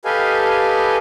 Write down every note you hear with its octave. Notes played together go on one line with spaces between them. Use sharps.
G4 A4 B4 D#5 F5 G#5